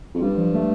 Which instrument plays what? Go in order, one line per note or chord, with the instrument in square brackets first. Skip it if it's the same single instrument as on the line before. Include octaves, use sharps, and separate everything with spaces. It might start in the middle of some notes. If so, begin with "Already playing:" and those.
[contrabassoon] F2
[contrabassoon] G2 [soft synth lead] G3
[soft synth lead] F3
A3